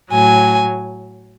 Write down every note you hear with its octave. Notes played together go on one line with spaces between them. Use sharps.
A2 F#3 G#5